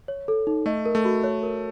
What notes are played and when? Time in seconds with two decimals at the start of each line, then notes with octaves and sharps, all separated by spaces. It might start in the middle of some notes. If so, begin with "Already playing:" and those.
0.08 C#5
0.28 A4
0.47 D#4
0.66 A3 D#5
0.86 A#4
0.95 A3
1.05 F#4
1.24 C#5
1.43 A#4